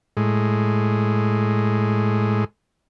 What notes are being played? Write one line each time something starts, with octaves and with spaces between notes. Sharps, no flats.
A2 G#3